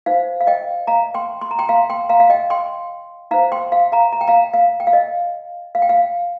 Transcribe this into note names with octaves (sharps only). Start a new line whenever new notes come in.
D#4 C5 F5
F5
D#5 G5
F5 A#5
G5 C6
C6
A#5
G5 C6
F5 A#5
G5 C6
F5 A#5
F5
D#5 G5
G5 C6
D#4 C5 F5 A#5
G5 C6
F5
F5 A#5
A#5
G5
F5 A#5
F5
G5
F5
D#5
F5
G5
F5